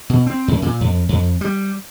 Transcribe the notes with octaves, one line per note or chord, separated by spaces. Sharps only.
B2
C4
F#2
A#2
F2
F2
G3